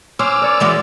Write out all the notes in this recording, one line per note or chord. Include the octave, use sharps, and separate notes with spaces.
C#4 C5 D6 E6 F6
A#4 C#5 D5
E3 G#3 F#4